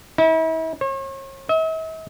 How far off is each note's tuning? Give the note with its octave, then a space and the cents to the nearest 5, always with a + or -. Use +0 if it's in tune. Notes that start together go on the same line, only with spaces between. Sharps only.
E4 -40
C#5 -40
E5 -45